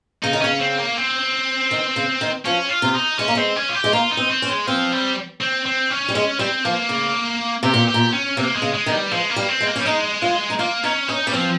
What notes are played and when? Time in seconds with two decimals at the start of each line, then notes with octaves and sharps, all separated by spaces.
0.23 C#3 D#4
0.33 D#3
0.42 C#3 C#4
0.60 C4
0.78 A#3
0.97 C4
1.71 D#3
1.96 C#3
2.21 D#3
2.45 F3 C#4
2.70 F4
2.82 C3
2.95 D#4
3.19 G#3 C#4
3.28 A#3
3.35 G#3 C4
3.56 C#4
3.69 F4
3.75 G4
3.84 G#3
3.93 A#3 F4
4.11 D#4
4.17 C4
4.31 C4
4.42 C#4
4.49 G#3
4.67 F3 C4
4.92 G3
5.41 C4
5.66 C4
5.91 C#4
6.09 G3
6.15 G#3 C#4
6.39 G3 C4
6.65 F3 A#3
6.89 C#3
7.63 C3 G4
7.74 A#2
7.88 G4
7.94 A#2
8.13 C#4
8.37 C3 A#3
8.56 G#3
8.62 C#3
8.74 G#3
8.86 D#3
8.92 G3
9.11 F3 G#3
9.29 A#3
9.36 G3
9.48 C4
9.61 G#3
9.67 A#3
9.76 G3 C#4
9.85 G#3 D#4
10.22 F4
10.50 D#4
10.59 A#3 F4
10.84 C#4 D#4
11.08 C#4 D#4
11.27 G3 C#4
11.33 F3 C4